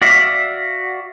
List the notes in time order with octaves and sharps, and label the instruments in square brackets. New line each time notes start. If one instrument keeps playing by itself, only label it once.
[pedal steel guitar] F#4 D5 E5 F5